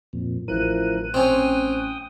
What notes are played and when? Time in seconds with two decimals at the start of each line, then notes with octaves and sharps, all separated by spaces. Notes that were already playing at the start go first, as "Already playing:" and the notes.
0.13 F2 A#2
0.48 A1 E3 F3 A#4 F#6 D#7
1.14 C4 C#4 G5 D#6